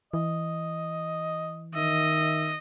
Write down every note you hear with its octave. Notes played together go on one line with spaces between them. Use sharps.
E3 D#5
D#3 D#5 E5